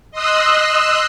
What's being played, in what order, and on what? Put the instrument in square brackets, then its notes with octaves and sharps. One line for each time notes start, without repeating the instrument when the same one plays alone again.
[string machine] D#5 C6 D#6 E6 F#6